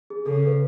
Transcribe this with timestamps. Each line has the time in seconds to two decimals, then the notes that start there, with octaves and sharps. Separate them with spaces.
0.10 G#4
0.26 C#3 A4
0.37 A4
0.47 B4